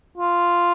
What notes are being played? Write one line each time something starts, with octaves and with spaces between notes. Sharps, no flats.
F4